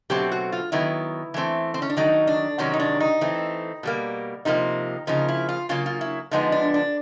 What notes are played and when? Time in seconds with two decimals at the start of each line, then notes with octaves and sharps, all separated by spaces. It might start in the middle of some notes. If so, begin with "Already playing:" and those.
0.10 B2 F#3 A3 C4 G4
0.32 F#4
0.52 F4
0.72 D#3 F#3 B3 E4
1.34 E3 A3 C4
1.74 C4
1.82 C#4
1.90 D4
1.97 D#3 F#3 A3 D#4
2.27 D4
2.58 C3 D#3 F#3 C#4
2.74 D#4
2.80 D4
3.00 D#4
3.21 E3 A3 C4
3.83 B2 G3 A#3
4.45 C3 F3 A#3 D#4
5.07 C#3 F3 A#3 D#4
5.28 E4
5.49 F4
5.69 C#3 F#3 A#3 F4
5.86 F4
6.01 E4
6.31 D3 F3 G#3 B3 D#4
6.52 D4
6.74 D4